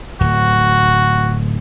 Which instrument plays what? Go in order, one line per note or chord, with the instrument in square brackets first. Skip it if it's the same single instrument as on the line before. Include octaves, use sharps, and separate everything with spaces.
[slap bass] D1 [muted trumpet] F#4